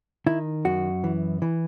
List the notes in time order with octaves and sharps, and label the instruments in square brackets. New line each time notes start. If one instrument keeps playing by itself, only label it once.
[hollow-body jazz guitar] D#3 E4
F#2 F#4
E3
E3